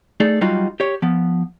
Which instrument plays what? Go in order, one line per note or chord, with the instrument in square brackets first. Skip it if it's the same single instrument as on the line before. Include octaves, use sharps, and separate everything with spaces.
[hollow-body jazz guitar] A3 D#4 G#4 D5
F#3 G3 D#4 F4 F#4
G4 C#5
F3 B3